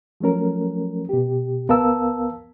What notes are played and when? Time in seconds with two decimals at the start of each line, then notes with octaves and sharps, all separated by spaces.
0.20 F3 F#3 A3 C#4 A#4
1.09 B2 G4
1.69 C#2 B3 A#4 F5 A5 E6